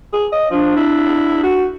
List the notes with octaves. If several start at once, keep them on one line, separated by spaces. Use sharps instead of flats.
G#4
D#5
F3 D4
E4
F#4